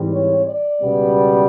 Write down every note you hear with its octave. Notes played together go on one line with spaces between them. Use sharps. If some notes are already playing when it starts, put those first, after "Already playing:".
Already playing: G#2 E3 G3 C4
C#5
D5
C#2 B2 G3 B3